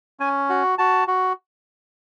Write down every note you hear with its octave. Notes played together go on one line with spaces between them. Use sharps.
C#4 G#5
F#4
F#4 A5
F#4